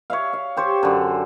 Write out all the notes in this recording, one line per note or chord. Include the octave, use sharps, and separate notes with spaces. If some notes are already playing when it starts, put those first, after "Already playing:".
C#5 E5 F5
F5
G4 C5 C#5
F#2 D3